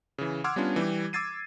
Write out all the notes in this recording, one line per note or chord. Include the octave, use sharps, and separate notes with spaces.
C#3 E3
F#5 C6 D6 E6 F6 G#6
G3 B3 C#4 D4 F4
E3 G3 G4
D6 E6 G#6 A6 C7 D#7